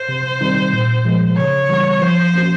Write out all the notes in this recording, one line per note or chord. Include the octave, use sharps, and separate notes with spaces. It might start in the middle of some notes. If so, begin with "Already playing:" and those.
Already playing: C5
C3
D#3 G3 C4 D#4
A#2
F3 G#3 B3
C#3 C#5
E3 G3 B3
F3 C5
A#3 C#4 F#4